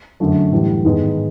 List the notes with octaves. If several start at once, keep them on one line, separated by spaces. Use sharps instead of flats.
F#2 D3 F#3 A3
A2 E3 G3
G#2 D#3 G#3 B3